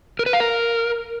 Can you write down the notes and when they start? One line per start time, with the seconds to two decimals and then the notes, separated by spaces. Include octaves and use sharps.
0.19 A#4
0.26 B4
0.33 F5
0.40 A#4